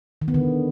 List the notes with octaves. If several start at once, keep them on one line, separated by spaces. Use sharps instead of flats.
D#3
B3
D3